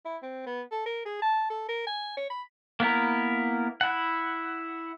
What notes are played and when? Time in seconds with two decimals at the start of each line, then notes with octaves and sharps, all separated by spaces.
0.05 E4
0.23 C4
0.47 B3
0.71 A4
0.86 A#4
1.06 G#4
1.22 A5
1.50 A4
1.68 A#4
1.87 G#5
2.17 C#5
2.30 B5
2.80 A#3 B3 E4 A#4
3.81 E4 F#5